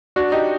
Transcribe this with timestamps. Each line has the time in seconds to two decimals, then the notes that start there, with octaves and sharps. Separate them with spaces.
0.16 D4 F#4
0.32 D#4 G4